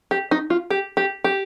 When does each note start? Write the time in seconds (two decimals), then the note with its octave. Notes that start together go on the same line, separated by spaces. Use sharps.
0.11 G4
0.31 D#4
0.50 F4
0.70 G4
0.97 G4
1.24 G4